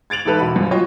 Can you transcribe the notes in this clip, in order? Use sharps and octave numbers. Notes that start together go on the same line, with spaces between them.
G#6 A6 D7 F7 F#7
A1 G#2 A4 B4
E1 F#4 B5
F#2 A#2 F3 G3
F4 F#4 C#5 D#5 F5